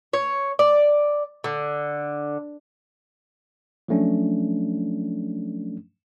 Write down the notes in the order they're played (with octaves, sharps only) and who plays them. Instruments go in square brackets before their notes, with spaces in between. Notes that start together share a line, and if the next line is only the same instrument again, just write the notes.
[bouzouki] C#5
D5
D3
[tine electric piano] F3 F#3 A3 C#4 D4